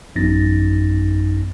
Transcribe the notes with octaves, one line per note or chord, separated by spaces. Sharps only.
A1 F#2 B3 D#4 A6 A#6